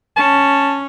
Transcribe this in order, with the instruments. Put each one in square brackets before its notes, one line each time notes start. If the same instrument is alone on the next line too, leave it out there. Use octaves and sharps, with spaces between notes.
[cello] C#4 [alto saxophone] A5